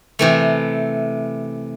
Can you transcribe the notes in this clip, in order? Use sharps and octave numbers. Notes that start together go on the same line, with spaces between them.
C3 E3 A3